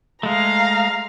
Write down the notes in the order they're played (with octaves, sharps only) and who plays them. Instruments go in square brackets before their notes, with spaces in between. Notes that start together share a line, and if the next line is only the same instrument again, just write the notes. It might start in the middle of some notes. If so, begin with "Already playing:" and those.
[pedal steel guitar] G#3 A3 [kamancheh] F5 A#5